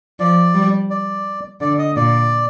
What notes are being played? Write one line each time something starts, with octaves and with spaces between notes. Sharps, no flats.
F3 D5
G3
D5
D3 D5
D#5
A#2 D5